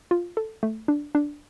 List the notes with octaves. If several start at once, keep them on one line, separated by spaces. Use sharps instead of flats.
F4
A4
A3
D4
D4